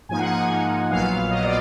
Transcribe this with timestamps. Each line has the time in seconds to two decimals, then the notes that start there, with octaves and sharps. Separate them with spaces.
0.09 G#2 F3 A#3 D#4 G#5
0.19 F#5
0.29 G#5
0.49 G#2 F3 A#3 D#4
0.90 A#1 A#2 F#3 B3 F5
1.30 A#1 A#2 F#3 B3 D#5
1.44 D5